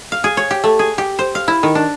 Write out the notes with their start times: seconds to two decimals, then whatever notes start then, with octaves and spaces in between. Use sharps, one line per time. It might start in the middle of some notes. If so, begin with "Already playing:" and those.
0.12 F5
0.24 G#4
0.37 C#5
0.51 G4
0.64 A3
0.79 G#4
0.98 G4
1.19 C5
1.35 F5
1.48 E4
1.63 D#3
1.75 D4